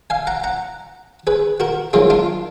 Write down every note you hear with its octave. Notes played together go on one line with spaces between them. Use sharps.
F5 G#5
F#5 A#5
F#5 A#5
G#4 B4
F#4 A#4
G#2 F#3 A#3 F4 G#4
D4 F4